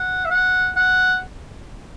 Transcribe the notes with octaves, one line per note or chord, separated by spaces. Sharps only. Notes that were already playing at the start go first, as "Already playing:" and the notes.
Already playing: F#5
E5
F#5
F#5